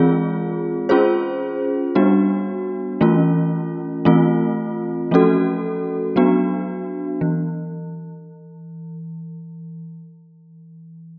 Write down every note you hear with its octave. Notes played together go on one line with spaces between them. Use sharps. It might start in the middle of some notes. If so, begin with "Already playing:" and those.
Already playing: E3 G#3 C4 F4 G#4
C#4 F4 G#4 C5
G3 B3 D4 F#4
E3 A3 C#4 F4
E3 A3 C4 F4
F3 A3 C#4 F#4 A4
F#3 B3 D4 F#4
E3